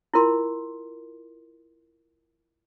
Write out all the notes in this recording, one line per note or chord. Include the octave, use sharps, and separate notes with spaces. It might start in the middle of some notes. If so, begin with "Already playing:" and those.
E4 F4 A#4 C6